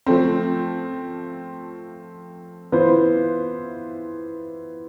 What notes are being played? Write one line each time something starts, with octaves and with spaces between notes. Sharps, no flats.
F3 A3 C4
E3 B3 F4 C5